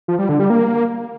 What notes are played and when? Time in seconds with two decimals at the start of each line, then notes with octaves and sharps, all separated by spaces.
0.08 F3
0.19 G3
0.29 D3
0.40 G3
0.50 A#3